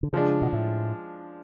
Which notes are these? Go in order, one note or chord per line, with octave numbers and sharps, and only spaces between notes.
D3
C#3 F3 G#3 D4
B2
A2